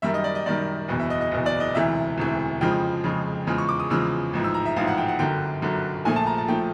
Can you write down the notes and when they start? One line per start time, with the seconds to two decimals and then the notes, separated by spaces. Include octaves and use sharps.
0.02 F#2 D#3 G3 E5
0.14 D#5
0.24 D5
0.35 D#5
0.46 F#2 D#3 G3 D5
0.88 F#1 E2 B2
0.99 E5
1.10 D#5
1.21 D#5
1.32 F#1 E2 B2
1.46 D5
1.60 D#5
1.75 E1 D2 C3 E3 E5
2.18 E1 D2 C3 E3
2.61 F2 C#3 F3 G#3 G5
3.04 F2 C#3 F3 G#3
3.47 E2 C#3 F3 G#3
3.58 C#6
3.69 D6
3.80 D#6
3.90 E2 C#3 F3 G#3 E6
4.33 A1 G#2 F3
4.44 E6
4.54 A#5
4.66 E5
4.76 A1 G#2 F3 F5
4.87 F#5
4.98 G5
5.08 F#5
5.19 G1 F#2 D3 F#3 G5
5.62 G1 F#2 D3 F#3
6.05 A#1 A#2 F3 A3 G#5
6.16 A5
6.27 A#5
6.38 A5
6.48 A#2 F3 A3 G5